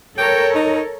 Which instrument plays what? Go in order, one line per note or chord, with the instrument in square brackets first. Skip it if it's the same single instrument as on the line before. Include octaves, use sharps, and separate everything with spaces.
[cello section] A4 A#4 C#5 [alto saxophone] G5
[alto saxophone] D#4